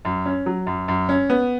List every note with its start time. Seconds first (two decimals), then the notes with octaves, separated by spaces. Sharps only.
0.05 F#2
0.26 C#4
0.46 F#3
0.67 F#2
0.88 F#2
1.09 C#4
1.30 B3